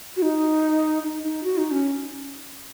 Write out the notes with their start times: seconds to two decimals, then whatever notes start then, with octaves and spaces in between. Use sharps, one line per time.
0.16 F#4
0.23 D#4
1.03 D#4
1.23 D#4
1.44 F#4
1.58 D#4
1.71 C#4